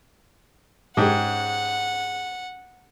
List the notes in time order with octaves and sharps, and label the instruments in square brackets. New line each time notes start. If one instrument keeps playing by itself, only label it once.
[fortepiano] G#2 [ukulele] C#4 G4 G#4 [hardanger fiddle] F#5